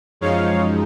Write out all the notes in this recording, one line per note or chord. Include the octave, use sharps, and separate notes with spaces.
F#2 F3 G#3 D#4 C#5 F5